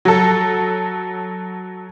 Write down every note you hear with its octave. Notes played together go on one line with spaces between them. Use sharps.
F#3 A4